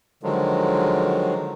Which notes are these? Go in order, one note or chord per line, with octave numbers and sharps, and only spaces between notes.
D3 D#3 F3 F#3 G#3